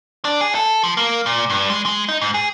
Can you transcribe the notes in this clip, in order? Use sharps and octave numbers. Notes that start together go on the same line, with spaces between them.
D4
G#4
A4
F3
A#3
A#2
G2
G#3
G#3
D#4
G#2
G#4